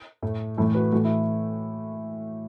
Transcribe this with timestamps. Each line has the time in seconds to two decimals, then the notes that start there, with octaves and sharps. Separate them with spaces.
0.22 A2 A3
0.57 A2 E3 A3 E4 A4
0.74 F#4 B4
0.92 A2 E3 A3 F#4
1.05 E4